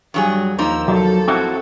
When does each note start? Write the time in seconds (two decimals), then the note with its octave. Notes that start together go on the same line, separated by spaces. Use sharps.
0.14 G2 F#3 G3 G#4
0.59 D#2 F3 A#3 D#4 E6
0.88 F#3 A4
1.28 C4 E4 F#4